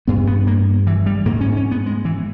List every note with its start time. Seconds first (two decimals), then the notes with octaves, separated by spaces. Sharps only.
0.07 G2 B3
0.27 B3
0.47 A#3
0.87 E3
1.06 G3
1.26 G#2 A#3
1.41 C#4
1.57 C#4
1.71 B3
1.86 G#3
2.05 E3